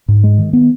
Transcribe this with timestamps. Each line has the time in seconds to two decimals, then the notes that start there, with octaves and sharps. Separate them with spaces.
0.08 G#2
0.24 G#3
0.38 D#3
0.53 B3